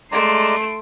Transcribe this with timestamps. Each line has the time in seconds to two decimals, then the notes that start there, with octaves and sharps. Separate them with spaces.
0.12 G#3 A3 D5 A#5 C6 C7 D7